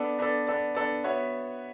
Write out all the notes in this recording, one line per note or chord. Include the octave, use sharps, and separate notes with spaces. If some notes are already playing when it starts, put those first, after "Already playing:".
Already playing: B3 D4 A4 D5
B3 D4 A4 D5
B3 D4 A4 D5
B3 D4 A4 D5
B3 F#4 C#5 E5